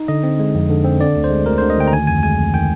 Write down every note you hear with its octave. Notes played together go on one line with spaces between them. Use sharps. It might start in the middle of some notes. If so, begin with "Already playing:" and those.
Already playing: D#4
D3 D#5
C4
G#3
F2
D3
C4
D3 D5
D2
C5
G#3
D2 A#4
D3 C5
D#5
D2 G5
A#5
D#3 G#5
F2 G#5
G#3 G#5
F2
D#3 G5